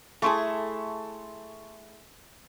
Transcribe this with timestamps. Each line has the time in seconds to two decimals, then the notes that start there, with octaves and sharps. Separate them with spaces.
0.22 A3 E4 G#4 A5 C6 C#6